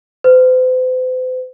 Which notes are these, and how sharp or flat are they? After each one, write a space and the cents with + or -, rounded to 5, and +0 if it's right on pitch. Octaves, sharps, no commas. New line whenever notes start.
C5 -45